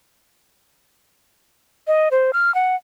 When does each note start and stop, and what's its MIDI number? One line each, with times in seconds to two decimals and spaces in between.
1.87 2.09 75
2.11 2.31 72
2.33 2.54 89
2.55 2.76 78